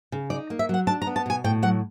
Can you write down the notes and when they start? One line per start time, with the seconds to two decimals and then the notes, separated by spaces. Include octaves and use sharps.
0.12 C#3
0.30 D#4 D5
0.50 A#3
0.59 E5
0.69 F#3 F#5
0.87 D4 A5
1.02 A#5
1.07 B3
1.16 A5
1.26 B2 G#5
1.44 A2 G5
1.62 F#3 F#5